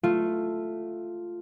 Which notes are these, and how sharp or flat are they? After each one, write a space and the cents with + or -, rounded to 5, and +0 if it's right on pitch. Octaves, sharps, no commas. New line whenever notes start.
A3 +0 F4 +0